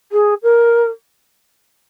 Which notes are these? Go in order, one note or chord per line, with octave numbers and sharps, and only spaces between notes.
G#4
A#4